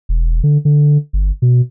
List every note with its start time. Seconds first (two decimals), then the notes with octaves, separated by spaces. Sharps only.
0.09 E1
0.43 D3
0.65 D3
1.13 G1
1.42 B2